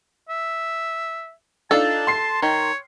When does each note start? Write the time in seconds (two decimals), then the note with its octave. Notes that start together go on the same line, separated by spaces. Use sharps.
0.29 E5
1.71 D4 D#4 F4 A4 A5
2.07 C6 C7
2.42 D#3 C#5